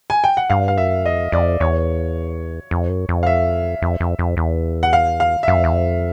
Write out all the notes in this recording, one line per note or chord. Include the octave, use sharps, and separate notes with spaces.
G#5
G5
F#5
G2 F5
F5
F#2 E5
F2 D#5
F2 D5
E2 C#5
F2
F#2
F2
F5
E5
F2
F2
F2
E2
F#5
F5
F5
E5
F#2 F5
F2
E2
F2